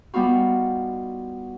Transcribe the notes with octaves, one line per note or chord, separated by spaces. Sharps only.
G3 B3 D#4 F4 F#4